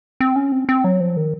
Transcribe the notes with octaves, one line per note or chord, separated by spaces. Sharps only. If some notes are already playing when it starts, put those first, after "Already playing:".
C4
C#4
C4
C4
F#3
F3
D#3